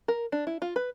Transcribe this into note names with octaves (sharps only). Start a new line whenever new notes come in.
A#4
D4
E4
F4
B4